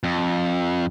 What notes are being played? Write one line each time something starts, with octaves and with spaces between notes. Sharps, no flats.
F2